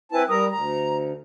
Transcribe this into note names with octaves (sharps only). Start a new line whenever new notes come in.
C4 E4 B4 G#5 A5
G3 A#4 A#5 D#6
D2 A#5